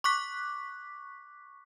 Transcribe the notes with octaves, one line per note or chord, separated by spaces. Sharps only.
C#6 D6 F#6 B6